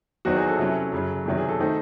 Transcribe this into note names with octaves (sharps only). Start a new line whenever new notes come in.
E2 D#3 F#3 C4 D#4 F#4
G#4
A4
C3 F#3 C#4 E4
F#2 C#3 F#3
E2 C3 D#3 F#3
G#4
A4
D#3 A3 C4 D#4